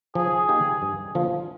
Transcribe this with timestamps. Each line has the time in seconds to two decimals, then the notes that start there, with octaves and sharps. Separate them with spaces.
0.15 F3 G#4
0.49 A#3 D#4 G4
0.82 G2
1.15 D3 F3 A#3 F4